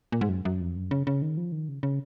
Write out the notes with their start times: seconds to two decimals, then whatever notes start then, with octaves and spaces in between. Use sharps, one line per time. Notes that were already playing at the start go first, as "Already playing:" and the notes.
0.12 A#2
0.21 G#2
0.29 F#2
0.45 F#2
0.60 F2
0.76 F#2
0.91 C#3
1.07 C#3
1.22 D#3
1.37 F3
1.52 D#3
1.68 C#3
1.83 C#3